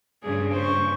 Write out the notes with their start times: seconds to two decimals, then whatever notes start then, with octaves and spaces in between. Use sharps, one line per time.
0.23 G2 A#2 C#3 G#4
0.53 C5 C#6